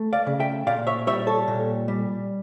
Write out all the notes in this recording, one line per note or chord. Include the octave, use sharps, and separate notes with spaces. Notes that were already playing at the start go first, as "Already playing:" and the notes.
Already playing: A3
D5 F5
C#3
E5 G5
A#2 D5 F5
C#5 E5
G3 C#5 E5
A4 C#5
A#2
G3